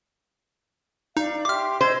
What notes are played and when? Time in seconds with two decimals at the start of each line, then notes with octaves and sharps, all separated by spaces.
1.17 D#4 D5 F5
1.45 G4 E5 C6 D6 F6
1.81 C5 D#5 E6 G#6